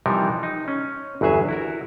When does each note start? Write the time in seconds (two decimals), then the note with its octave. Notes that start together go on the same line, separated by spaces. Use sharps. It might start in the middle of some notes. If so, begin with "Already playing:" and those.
0.06 C3 E3 F3 G3 D#4 A#4
0.43 D#4
0.68 C#4
1.21 G1 E2 F#3 G#4 E5 G#5
1.48 E4 F#4 A#4